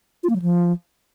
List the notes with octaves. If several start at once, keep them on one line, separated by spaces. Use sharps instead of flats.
F4
A#3
F#3
F3